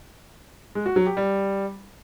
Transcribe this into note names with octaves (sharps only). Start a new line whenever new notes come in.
G#3
F#4
F#3
G4
G3